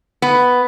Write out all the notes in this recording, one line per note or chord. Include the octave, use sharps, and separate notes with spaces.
B3